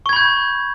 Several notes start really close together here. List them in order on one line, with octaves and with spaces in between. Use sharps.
C#6 G#6 B5 G6